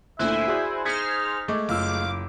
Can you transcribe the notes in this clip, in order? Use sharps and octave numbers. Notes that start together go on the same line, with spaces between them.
D2 A#2 D3 E4 C5 E5 G#5 F#6
F#4 G#4 D5
D#4 G#4 C5 F6 G#6 B6 C#7
G#3 A3 D6
F#1 F4 F5 D6 E6